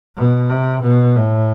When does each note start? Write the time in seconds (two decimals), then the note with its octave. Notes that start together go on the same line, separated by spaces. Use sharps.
0.16 B2
0.50 C3
0.82 B2
1.16 A2